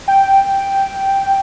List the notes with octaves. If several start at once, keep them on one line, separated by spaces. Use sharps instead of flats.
G5